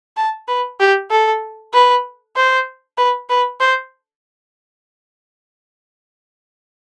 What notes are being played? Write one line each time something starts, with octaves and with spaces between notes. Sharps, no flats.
A5
B4
G4
A4
B4
C5
B4
B4
C5